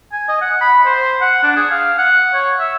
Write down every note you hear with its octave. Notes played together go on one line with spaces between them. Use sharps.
G#5
D#5
F#5
B5
C5
F#5
D4
G#4
F5
F#5
C#5
E5